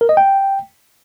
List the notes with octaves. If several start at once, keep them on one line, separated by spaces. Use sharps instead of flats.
A#4
D#5
G5